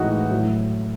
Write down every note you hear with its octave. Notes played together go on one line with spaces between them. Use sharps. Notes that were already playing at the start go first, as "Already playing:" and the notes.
Already playing: A2 E3 G#3 D#4 F#4
A2 F#3